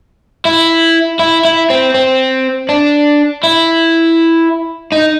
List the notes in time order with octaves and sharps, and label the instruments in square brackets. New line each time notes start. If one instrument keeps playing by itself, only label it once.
[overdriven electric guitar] E4
E4
E4
C4
C4
D4
E4
D#4